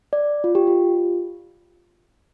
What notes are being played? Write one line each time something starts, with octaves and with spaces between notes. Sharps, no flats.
D5
F4
G4
F4